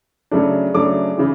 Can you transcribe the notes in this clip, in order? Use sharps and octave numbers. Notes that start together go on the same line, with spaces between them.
C#3 F#3 A3 D4
C#3 F#3 A3 D4 D6
C#3 E3